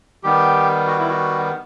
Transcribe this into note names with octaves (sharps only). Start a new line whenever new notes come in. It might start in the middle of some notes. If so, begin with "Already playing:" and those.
D#3 G3 B3 G4
F#4
E4
F#4